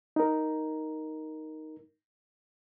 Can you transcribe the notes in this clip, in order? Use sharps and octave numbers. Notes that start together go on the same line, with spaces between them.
D#4 A#4